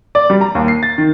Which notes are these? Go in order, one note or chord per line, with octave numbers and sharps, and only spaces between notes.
D5
G3
A#5
D#2
C7
A6
D#3